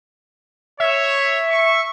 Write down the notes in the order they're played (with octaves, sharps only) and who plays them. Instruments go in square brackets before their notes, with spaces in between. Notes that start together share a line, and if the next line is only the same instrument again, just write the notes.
[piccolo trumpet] C#5 [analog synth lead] E5
[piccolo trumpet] C#6